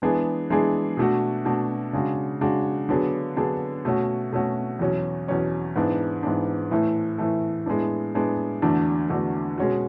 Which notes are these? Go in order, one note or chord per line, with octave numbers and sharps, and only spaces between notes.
E3 G#3 B3 D4 G#4
E3 G#3 B3 D4 G#4
B2 A3 D4 F#4
B2 A3 D4 F#4
C#3 G#3 D4 F#4
C#3 G#3 D4 F#4
D3 F#3 B3 D4 G#4
D3 F#3 B3 D4 G#4
B2 A3 C#4 F#4
B2 A3 C#4 F#4
E2 B2 F#3 C#4
E2 B2 F#3 C#4
G#2 E3 B3 D4
G#2 E3 B3 D4
A2 E3 A3
A2 E3 A3
A2 G#3 B3 D4
A2 G#3 B3 D4
E2 D3 A3 D4 F#4
E2 D3 A3 D4 F#4
B2 G#3 C#4 F#4